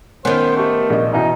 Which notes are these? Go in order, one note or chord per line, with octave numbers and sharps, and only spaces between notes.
D#3 B3 C#4 C5
A3 G4
A#1 D#5
B2 E3 D#4